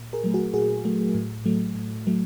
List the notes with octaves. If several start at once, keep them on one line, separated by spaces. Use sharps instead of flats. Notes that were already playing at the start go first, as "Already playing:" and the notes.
Already playing: A#2
G#4 A#4
F#3 A3
F#4 G#4
A#2 F#4 G#4
F#3 A3
A2
F#3 A3
A2
F#3 A3